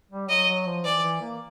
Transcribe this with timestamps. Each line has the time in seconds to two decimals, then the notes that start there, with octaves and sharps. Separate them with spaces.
0.11 G3
0.29 F#3 D#5
0.48 F#3
0.66 F3
0.84 E3 D5
1.03 E3
1.21 A#3